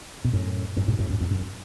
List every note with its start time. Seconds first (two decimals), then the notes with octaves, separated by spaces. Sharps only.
0.25 B2
0.33 F#2 A2
0.77 F#2 A2
0.88 G#2 B2
0.99 F#2 A2
1.10 F#2
1.21 E2
1.31 F#2